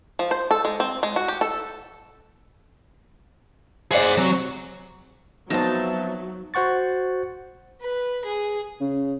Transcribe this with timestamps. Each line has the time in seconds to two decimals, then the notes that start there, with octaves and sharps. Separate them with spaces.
0.19 F3
0.31 C5
0.51 A4
0.65 G#3
0.80 C4
1.03 G#3
1.16 F#4
1.28 G4
1.41 A4
3.91 G#4 C5 D5 F#5
4.17 C3 F#3
5.50 F3 F#3 B3 C4 D#4 E5 A5
6.54 F#4 C5 F#5 C#6 A6
7.81 B4
8.25 G#4
8.81 C#3